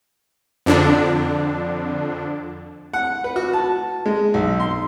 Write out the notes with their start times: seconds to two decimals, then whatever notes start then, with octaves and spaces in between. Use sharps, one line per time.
0.66 F2 D3 D4
2.93 F#5
3.24 B4
3.36 F#4
3.53 A5
4.06 G#3
4.34 B1
4.60 C6